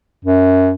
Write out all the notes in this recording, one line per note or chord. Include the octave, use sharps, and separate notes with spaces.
F#2